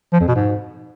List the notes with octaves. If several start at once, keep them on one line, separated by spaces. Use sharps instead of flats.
F3
F2
B2
G#2